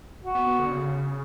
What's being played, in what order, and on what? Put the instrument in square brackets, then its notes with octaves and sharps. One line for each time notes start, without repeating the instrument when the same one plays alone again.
[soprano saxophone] F#4
[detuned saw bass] B3
B3
D3
C#3